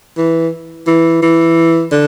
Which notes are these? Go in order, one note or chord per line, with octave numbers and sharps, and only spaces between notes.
E3
E3
E3
D3